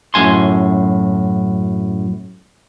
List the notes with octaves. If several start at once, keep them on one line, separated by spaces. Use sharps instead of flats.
F#2 A2 G#5 C6